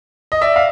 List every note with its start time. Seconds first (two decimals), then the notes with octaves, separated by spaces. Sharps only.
0.32 D#5
0.42 D5 E5
0.56 F5